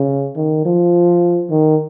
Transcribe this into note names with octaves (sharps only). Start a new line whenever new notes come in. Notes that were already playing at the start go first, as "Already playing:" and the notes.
Already playing: C#3
D#3
F3
D#3